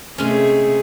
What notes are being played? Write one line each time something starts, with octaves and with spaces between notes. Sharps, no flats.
C3 G#3 A3 C#4 G#4